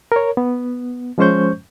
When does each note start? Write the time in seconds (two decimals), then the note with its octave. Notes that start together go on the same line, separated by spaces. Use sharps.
0.12 A#4 C#5
0.37 B3
1.18 F3 G#3 C#4 C5 C#6 G6